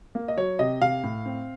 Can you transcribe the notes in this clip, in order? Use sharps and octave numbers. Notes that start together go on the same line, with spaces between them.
A#3
D#5
F#3 C#5
C3 D#5
C3 F5
A2
C4